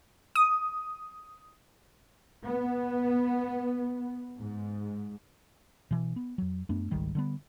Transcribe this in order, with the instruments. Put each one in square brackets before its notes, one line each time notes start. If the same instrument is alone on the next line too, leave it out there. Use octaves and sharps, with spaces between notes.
[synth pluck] D#6
[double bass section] B3
G#2
[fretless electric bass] B2 E3
B3
F2 F#3
F#2 A3 B3 D4
G#1 C#2 D#3 G3
D3 G3 B3